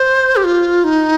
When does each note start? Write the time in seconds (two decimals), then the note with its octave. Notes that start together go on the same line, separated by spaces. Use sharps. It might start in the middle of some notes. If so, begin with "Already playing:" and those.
Already playing: C5
0.36 G4
0.44 F4
0.84 D#4